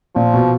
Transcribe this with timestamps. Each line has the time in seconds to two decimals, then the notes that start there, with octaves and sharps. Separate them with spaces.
0.16 A#2 F3
0.34 B2